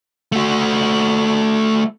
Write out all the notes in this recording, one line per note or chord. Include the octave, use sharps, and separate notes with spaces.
A3 F#4